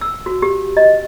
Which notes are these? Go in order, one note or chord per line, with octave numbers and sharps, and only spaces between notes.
E6
F#4
G4
D#5